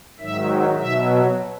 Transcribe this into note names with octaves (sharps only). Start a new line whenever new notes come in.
G#2 D#3 F#3 E5
B2 F#3 E5